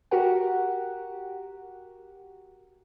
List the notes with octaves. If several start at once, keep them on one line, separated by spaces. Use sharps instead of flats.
F#4 G4 A#4 F#5